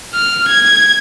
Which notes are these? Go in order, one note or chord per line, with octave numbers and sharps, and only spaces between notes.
F6
G#6